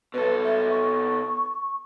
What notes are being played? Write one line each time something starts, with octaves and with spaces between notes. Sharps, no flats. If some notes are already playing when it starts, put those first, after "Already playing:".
B2 A4 B4
E5
C#6